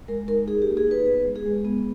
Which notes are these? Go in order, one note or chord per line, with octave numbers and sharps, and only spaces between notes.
G#3 A#4
D#4 A#4
D#4 G#4
G4
A#3
G#4
D#4 B4
B3 B4
G#3
G#4
G#3
B3